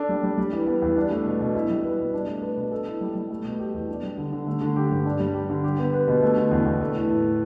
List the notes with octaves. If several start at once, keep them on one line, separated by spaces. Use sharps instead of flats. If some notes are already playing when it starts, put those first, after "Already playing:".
Already playing: D4 A4
G3
G3
G3
E3
B3
E2
D4
A3
B2
B2
E4
G3
B4
B2
D4
A3
B4
B2
A4
E4
G3
G3
A3
B2
G4
E2
D4
G3
D3
D3
A3
D3
G4
G2
D4
G3
G4
D3
G4
B3
B4
B2
A3
D3
E2
E2
A3
E3
A2
A2